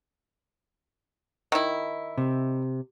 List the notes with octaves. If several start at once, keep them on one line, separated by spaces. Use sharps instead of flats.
D#3 E4
C3